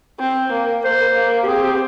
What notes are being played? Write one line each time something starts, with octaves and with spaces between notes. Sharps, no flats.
C4 C5
A#3
A#3 C5
A#3
G4
C4 G#4
G4